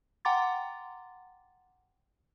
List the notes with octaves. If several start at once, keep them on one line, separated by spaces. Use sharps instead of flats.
F#5 G5 A#5 C6 D6 A6